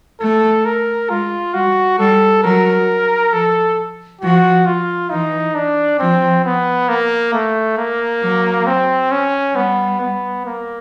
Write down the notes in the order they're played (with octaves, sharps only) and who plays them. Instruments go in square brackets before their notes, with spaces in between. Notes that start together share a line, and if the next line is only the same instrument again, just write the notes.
[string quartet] A3 [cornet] A4
[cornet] A#4
[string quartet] G#3 [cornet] F4
[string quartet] G3 [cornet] F#4
[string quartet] G3 [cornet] A4
[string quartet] F#3 [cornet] A#4
[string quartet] F3 [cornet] A4
[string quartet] F3 [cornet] F#4
[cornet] F4
[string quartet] E3 [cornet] D#4
[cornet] D4
[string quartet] F3 [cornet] C4
[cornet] B3
A#3
A3
A#3
[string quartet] F#3
[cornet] C4
C#4
[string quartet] G3 [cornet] B3
[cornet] B3
A#3